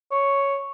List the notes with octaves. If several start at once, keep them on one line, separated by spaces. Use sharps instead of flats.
C#5